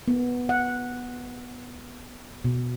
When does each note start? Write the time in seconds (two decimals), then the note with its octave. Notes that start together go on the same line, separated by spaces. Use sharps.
0.08 B3
0.49 F#5
2.45 B2